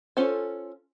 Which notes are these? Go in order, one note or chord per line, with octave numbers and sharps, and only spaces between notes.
C#4 F4 A4 C5 G#5